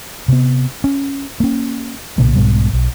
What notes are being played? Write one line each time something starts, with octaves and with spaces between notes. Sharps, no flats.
C3 B3
C#4
A#3 C#4
B1 A#2 C#3 A#3
B1 G#2 B2 G3
B1